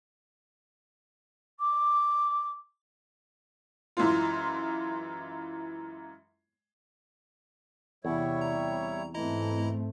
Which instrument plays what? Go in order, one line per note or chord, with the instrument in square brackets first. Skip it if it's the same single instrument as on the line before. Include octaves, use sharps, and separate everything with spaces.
[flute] D6
[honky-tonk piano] F#2 E3 G#3 F4
[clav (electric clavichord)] E2 [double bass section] C3 [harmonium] G3 E4 C#5
[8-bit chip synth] A#5
[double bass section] G#2 A3 C4 [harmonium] E3 [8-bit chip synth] E4 D#5 A#5